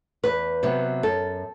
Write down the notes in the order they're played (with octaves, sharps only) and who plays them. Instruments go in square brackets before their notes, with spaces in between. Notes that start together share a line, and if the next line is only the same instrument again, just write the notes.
[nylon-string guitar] E2 B4
C3 F#3 B3
F#2 A4